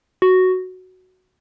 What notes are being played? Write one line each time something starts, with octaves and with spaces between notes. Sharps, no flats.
F#4